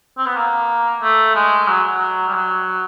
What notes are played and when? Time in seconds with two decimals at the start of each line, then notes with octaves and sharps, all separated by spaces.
0.18 C4
0.26 B3
0.37 A#3
1.02 A3
1.35 G#3
1.68 F#3
1.95 F#3
2.28 G3
2.34 F#3